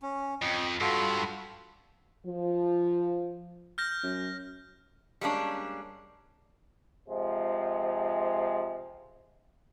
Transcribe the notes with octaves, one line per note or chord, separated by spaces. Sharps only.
C#4
F2 D#5 G5
G2 F4 F#4 A4
F3
F6 G6 A#6
F#2
G3 G#3 A#3 C#4 D4
C3 F3 G#3